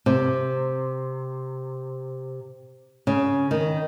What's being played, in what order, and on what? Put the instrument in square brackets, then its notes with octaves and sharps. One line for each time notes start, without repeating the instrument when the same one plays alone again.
[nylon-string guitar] C3
C#3
D#3